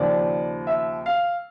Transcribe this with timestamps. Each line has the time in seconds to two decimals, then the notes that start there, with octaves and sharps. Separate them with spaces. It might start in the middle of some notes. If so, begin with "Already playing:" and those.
Already playing: D#2 C#3 F3 D5
0.67 E5
1.06 F5